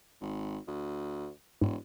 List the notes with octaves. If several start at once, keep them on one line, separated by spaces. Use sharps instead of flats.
G#1
D2
E1 G#2